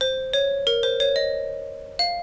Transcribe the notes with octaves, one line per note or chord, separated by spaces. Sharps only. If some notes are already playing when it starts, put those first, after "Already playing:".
C5
C#5
A#4
C5
C#5
D#5
F5